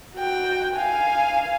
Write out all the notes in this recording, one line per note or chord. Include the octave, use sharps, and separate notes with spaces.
F#4 G5
F5 G#5